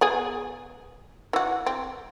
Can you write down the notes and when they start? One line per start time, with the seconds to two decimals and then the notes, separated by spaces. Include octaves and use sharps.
0.01 B3 G#4 G#5
1.33 E3 F#4
1.66 C4